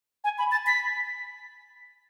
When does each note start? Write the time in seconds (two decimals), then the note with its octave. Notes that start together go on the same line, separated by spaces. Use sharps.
0.24 G#5
0.38 B5
0.52 A6
0.67 B6